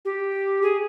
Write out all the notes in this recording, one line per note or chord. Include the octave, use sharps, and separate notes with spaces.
G4
G#4